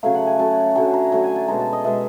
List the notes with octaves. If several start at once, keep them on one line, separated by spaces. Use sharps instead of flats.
C#3 F#3 A3 F5
F#5
G#5
C#3 F#3 A3 A5
D3 F#3 A3 G#5
A#5
D3 F#3 A3
G#5
A5
B2 G#3 A#5
A5
D#5
B2 G#3 E5